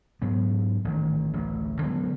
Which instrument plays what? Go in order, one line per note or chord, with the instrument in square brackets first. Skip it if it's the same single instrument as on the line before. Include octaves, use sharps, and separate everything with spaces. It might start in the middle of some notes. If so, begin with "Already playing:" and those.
[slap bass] G#2 F#3 B3
A1 D#3
A1 D2
D3 F#3 G#3 B3